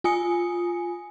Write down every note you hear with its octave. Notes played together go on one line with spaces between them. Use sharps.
F4 G#5 D#6 C#7